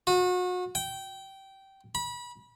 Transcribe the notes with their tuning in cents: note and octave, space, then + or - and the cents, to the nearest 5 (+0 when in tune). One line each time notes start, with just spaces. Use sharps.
F#4 -35
G5 -15
B5 -30